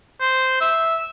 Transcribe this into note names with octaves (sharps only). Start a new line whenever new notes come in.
C5
E5